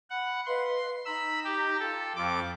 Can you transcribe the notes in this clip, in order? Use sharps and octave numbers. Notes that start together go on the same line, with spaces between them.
F#5 B5
B4 D#5 F5 C6
D#4 A#5 B5 E6
G4
F4 A4 G5
F2 D6